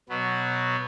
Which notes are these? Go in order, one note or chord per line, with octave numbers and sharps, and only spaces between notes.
B2 F#3 B3